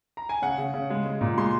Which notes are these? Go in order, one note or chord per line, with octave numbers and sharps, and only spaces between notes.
A#5
G#5
C#3 F#5
C#3
C#3
G#3
G#3
A#2
G#3 C6